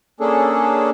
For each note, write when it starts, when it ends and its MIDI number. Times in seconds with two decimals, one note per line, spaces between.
0.20 0.90 58
0.20 0.90 61
0.20 0.90 62
0.20 0.90 68
0.20 0.90 69